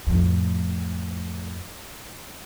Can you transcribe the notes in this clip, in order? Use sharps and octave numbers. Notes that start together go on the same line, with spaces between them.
F2 A2